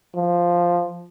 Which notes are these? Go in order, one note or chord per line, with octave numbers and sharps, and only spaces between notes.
F3